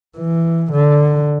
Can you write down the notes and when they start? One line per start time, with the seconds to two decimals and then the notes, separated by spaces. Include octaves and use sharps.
0.17 E3
0.72 D3